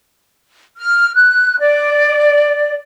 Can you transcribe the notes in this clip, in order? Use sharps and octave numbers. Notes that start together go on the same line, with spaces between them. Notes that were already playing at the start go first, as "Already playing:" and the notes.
F6
F#6
D5